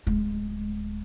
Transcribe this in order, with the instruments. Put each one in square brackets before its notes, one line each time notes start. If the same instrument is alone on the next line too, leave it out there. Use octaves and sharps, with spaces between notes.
[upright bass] D1 G#3